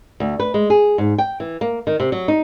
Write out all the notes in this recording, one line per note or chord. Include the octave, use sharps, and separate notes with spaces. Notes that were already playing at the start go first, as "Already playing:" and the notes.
D2
B4
G#3
G#4
G#2
G5
E3
A#3
D#3
C3
F#3
D#4